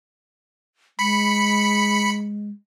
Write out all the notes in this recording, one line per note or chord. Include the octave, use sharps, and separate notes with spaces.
G#3 B5 B6 C#7